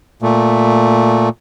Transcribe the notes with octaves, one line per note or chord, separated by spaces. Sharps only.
A#2 A3